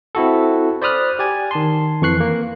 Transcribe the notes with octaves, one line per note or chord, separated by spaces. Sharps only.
C4 E4 F#4 A4
C5 D5 B5 D#6 F6 F#6
G4 D5 G#5
D#3 A5 C6
F2 E3 C#6 F#6 C7
A#3